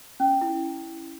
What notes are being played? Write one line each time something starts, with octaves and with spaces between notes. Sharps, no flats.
C#4
E4